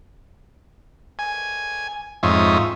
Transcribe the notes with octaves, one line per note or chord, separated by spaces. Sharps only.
G#5
F2 G#2 F4 C#5 E5 D#6